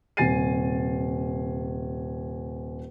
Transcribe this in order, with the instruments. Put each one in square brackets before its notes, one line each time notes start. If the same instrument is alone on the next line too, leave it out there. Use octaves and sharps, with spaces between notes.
[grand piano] D#1 C3 G#5 A6 C7 D#7